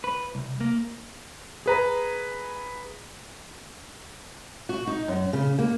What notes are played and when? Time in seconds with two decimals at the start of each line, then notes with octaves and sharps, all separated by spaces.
0.04 B4
0.35 C2
0.61 A#3
1.66 G#4 B4 A#5
4.69 F#4
4.87 D#4
5.08 F#2
5.33 C#3
5.59 A#3